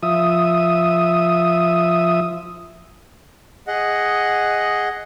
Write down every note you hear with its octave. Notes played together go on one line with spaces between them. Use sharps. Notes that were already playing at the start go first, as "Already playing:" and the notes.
F3 E5 D#6
G#4 D#5 F#5